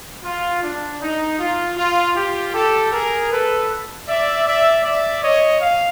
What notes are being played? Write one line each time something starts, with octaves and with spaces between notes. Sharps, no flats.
F4
D4
D#4
F4
F4
F4 G4
G4 A4
G#4 A#4
A4 B4
D5 E5
D5 E5
D5 E5
C#5 D#5
F5